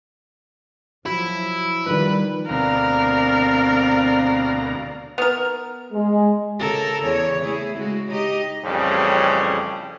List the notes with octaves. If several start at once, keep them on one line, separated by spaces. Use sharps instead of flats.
F3 F#3 E4 F#4
D#3 F3 G3 B4
D2 B2 C4 A#4 D5 F5 A#5
B3 A#4
G#3
C#3 A4 A#4
E2 C#3 C#5
A3 E4 G#4
C#3 G#3 F#4
D#4 G4 D#5
A1 F2 C#3 G3 C#4